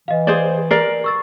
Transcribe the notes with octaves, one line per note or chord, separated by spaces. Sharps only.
E3 D#5 F5
G#4 C5 D5
A#4 D5 C7
C#6 E6 A6